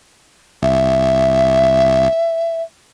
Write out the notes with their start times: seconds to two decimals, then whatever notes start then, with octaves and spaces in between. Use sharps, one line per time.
0.63 C2 E5